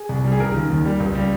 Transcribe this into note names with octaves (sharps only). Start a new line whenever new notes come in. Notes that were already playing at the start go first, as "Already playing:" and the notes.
Already playing: G#4
C2
G3
G#4
C#2 A#4
D#3
D#2
G3
C#2
G3